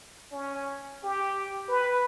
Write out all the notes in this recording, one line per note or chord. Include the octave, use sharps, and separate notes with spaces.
C#4
G4
B4